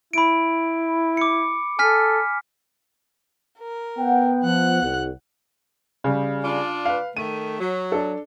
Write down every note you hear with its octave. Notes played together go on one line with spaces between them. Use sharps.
E4 B5 D7
D6 C#7
A4 G#5 F6 B6
A#4
B3 F#5 G5
F3 F#5 F#6
C2
C#3 G3
D4 F4 D5
B4 F5
D#3 A3 D#7
F#3
D4 A4